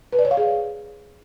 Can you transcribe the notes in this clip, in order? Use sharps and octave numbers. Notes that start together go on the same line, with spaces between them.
B4
D5
C#5
F5
G#4